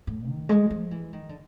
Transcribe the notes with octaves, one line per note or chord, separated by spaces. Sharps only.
A2
D#3
G#3
F3
E3
D#3
D3